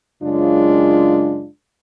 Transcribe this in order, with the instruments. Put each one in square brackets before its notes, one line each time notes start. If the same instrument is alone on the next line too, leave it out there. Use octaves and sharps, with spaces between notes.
[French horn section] F#2 C#3 G#3 D4 F4